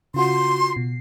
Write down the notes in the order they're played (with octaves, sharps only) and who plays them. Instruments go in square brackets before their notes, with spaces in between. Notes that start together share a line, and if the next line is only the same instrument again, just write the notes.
[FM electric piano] C#3 F4 F#4 [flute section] C6
[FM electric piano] B2 C7